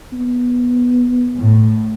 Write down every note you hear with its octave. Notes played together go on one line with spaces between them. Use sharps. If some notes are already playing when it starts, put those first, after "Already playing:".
B3
A2